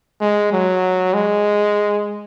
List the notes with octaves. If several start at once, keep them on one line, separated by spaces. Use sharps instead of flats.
G#3
F#3
G#3